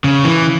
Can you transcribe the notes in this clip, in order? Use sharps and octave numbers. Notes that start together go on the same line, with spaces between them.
C#3
E3